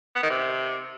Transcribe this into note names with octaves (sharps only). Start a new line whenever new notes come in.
B3
D#3
C3